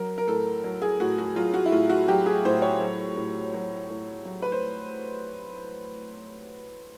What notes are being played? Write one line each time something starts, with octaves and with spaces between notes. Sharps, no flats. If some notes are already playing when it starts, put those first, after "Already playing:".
Already playing: F#3 A#4
A#4
A2 A4
F#3
G#4
A2 F#4
F#4
F#3 F4
F#4
E4
A2 F4
F#4
F#3 G4
G#4
A2 C5
C#5
F#3
A2
F#3
A2
F#3
B4
C5